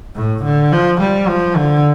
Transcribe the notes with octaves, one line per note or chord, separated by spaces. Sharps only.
A2
D3
F3
G3
F3
D3